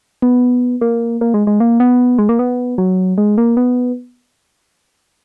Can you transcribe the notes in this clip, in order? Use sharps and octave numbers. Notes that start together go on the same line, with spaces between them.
B3
A#3
A#3
G#3
G#3
A#3
B3
G#3
A#3
B3
F#3
G#3
A#3
B3